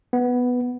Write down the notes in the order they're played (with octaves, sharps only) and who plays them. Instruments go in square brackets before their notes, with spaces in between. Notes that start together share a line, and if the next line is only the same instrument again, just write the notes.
[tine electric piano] B3